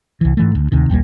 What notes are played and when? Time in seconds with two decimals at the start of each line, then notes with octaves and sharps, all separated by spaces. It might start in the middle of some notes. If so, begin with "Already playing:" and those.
0.21 C2 E3
0.37 G#2 E3 A3
0.55 D2
0.72 D2 C3 D#3
0.90 A#1 D#2 G3 A#3